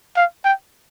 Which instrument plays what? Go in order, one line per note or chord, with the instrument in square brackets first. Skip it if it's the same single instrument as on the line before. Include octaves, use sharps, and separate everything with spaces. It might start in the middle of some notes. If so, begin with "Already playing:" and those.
[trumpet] F5
G5